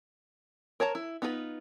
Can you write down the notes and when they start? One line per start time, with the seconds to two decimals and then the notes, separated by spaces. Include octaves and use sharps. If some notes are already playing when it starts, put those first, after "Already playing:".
0.80 A#4 C#5 A5 A#5
0.95 E4
1.22 B3 D#4 F4 G#4 B4